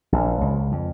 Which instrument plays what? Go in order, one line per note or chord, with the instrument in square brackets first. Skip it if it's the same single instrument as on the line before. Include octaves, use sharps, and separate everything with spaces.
[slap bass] A#1
C#2
F2